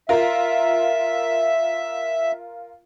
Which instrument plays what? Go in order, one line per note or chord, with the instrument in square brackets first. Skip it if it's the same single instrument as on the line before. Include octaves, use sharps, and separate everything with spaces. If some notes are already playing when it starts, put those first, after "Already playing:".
[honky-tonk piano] F4 A#4 [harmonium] E5